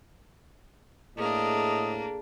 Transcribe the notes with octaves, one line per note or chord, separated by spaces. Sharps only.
A2 A#3 D4 G#4 A4 D#5